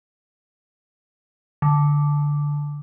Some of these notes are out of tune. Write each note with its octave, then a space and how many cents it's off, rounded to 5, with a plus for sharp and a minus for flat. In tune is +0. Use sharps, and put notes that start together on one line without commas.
D3 -5